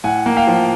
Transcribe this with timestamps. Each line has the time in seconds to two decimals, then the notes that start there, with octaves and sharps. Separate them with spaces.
0.04 A2 F#5 G#5
0.26 A#3
0.37 F5 G5
0.47 F3